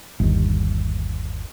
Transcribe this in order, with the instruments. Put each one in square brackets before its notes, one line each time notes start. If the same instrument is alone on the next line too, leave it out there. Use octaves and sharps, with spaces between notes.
[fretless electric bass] G1 D#2